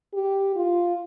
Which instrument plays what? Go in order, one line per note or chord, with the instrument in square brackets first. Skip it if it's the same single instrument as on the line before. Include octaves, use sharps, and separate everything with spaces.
[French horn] G4
F4